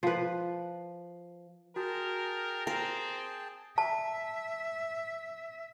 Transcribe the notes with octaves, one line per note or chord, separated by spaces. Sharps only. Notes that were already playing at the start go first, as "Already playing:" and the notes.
F3 B4
F#4 G#4 A#4 G5 A5
C4 A#4
E5 A5